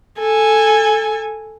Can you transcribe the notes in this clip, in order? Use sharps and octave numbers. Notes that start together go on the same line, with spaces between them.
A4 G#5